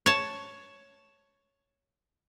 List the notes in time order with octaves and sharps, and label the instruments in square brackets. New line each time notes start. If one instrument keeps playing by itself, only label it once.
[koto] C#5 A5